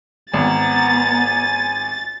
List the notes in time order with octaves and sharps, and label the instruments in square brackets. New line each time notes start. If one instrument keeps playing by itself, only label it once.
[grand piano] G#1 [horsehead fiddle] B3 A#5 [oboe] G#5 [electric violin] A6